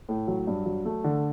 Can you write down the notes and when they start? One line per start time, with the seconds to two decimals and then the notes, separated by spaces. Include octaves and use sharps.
0.09 A2
0.28 F#3
0.47 G2
0.66 F#3
0.85 A3
1.04 D3